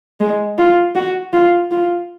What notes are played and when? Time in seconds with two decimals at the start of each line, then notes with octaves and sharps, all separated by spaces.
0.20 G#3
0.58 F4
0.95 F#4
1.33 F4
1.71 F4